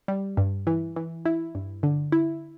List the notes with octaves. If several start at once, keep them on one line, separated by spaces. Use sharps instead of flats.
G3
G2
E3
E3
E4
G2
D3
E4